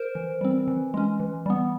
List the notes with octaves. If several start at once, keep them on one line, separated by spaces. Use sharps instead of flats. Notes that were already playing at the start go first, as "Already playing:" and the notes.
Already playing: A#4 C5
E3
G3 C4
E3
G#3 C#4
E3
G3 B3